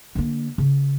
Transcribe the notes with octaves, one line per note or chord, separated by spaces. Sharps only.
D3 A#3
C#3